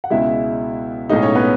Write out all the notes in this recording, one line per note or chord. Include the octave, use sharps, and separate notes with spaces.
F#5
C#2 B2 G#3 E4 E5
B1 A2 G#3 D#4 D#5
C#4 C#5
B3 B4